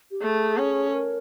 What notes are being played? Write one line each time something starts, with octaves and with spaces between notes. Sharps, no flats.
G4
A3 G#4
C#4
A4
A#4